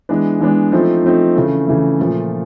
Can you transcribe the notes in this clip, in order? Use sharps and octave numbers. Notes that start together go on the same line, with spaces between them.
E3 G#3 B3 D4
E3 G#3 B3 D4
F3 A3 C4 D#4
F3 A3 C4 D#4
C#3 E3 A3
C#3 E3 A3
A#2 F3 A3